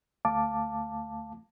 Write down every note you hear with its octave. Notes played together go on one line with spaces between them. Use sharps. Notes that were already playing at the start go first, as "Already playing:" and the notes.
D2 A3 F5 A5 D6